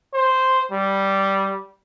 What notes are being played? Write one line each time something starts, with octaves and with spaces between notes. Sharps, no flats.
C5
G3